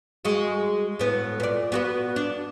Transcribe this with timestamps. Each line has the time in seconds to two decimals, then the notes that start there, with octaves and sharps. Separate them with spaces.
0.25 G#3 F#4
0.99 A2 B3
1.40 A#2 D5
1.72 B3 F#4 B4
2.16 D4